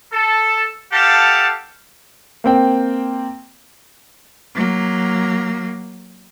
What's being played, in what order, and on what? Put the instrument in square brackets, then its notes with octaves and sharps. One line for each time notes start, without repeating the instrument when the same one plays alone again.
[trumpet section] A4
G4 A4 F5 F#5 A5
[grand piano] A#3 C4 G5
[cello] F#3 A#3